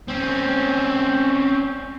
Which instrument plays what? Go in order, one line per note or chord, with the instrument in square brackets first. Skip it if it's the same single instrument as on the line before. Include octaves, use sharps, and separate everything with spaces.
[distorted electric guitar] C4 C#4